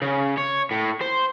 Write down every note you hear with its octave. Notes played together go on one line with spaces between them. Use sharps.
C#3
C#5
A2
C5